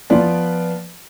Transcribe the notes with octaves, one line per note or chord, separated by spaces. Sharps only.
F3 B3 F4 B4 D5